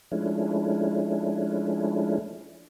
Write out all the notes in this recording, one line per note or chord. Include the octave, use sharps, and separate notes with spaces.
F3 G#3 A3 C#4 D4 E4